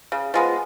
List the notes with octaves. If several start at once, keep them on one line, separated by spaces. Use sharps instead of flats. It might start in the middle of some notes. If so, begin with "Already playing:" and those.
C#3
F3 G#3 B3